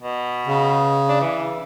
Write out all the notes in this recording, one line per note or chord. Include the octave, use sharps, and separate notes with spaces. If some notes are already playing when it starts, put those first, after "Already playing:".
B2
C#3
D4
E3